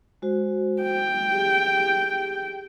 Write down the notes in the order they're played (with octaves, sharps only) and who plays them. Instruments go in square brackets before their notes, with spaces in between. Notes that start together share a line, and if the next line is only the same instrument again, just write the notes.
[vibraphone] G#3 F#4 C5
[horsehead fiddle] G5
[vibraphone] G4 G#4